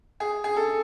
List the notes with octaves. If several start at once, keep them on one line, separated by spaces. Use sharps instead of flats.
G#4
G#4
A4